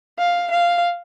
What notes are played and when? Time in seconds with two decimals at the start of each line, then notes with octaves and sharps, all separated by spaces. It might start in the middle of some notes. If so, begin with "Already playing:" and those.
0.18 F5
0.50 F5